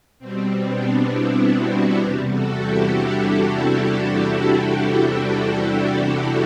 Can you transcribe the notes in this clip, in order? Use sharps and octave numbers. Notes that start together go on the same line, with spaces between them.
B2 G3 C4
B3 D4
C4 E4
D4 F#4
E2 C3 G3 G4 B4
F#4 A4
E4 G4
D4 F#4